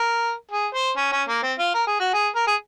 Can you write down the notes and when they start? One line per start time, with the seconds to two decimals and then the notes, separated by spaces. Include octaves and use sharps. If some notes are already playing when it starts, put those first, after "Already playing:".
Already playing: A#4
0.51 G#4
0.75 C5
0.97 C#4
1.12 C#4
1.29 A#3
1.43 C4
1.59 F4
1.74 A#4
1.87 G#4
2.00 F#4
2.14 G#4
2.36 A#4
2.47 G#4